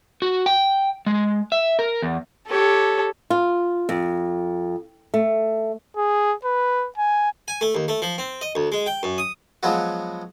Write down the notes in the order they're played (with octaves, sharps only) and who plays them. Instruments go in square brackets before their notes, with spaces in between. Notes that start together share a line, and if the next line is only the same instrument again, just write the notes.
[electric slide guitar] F#4
G5
G#3
E5
A#4
E2
[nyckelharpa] G4 C#5 [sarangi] A4
[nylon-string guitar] F4
F2
A3
[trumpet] G#4
B4
G#5
[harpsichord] G#5
A3
D#2
A3
F3
C4
D#5
D2
G#3
G5
F#2
D#6
F3 F#3 G#3 B3 F#4